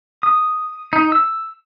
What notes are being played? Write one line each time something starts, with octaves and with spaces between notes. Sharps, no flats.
D#6
D#4
E6